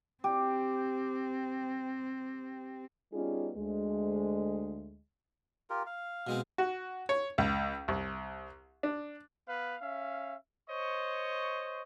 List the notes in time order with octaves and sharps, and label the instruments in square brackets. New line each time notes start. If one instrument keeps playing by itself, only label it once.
[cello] C4 [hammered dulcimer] G4
[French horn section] G3 B3 C#4 D#4 F4 G#4
D2 G#3
[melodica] F4 G4 A#4
F5
[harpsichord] B2 G#3 C4
[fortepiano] F#4
C#5
C#2
C2
D4
[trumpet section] B3 B4 F5
C#4 E5 F5
C5 C#5 D#5 C#6